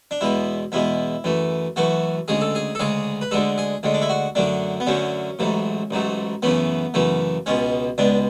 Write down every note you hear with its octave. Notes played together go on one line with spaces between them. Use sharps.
D4
E2 B2 G#3 E4
E2 B2 G#3 E4
F#2 E3 A3
F#2 E3 A3 F#4
D2 C#3 G#3 G#4
A4
G#4
A4
D2 C#3 G#3 G#4
B4
D2 D3 G#3 A4
G#4
D2 D3 G#3
D4
E4
F#4
F#2 D3 F#3 A3 D4
B3
F#2 D3 F#3 A3 C#4
A1 G#2 F#3 A3
A1 G#2 F#3 A3
F#2 C#3 E3 A3 B3
F#2 C#3 E3 A3
C#2 B2 G#3 C#4
C#2 B2 G#3 D4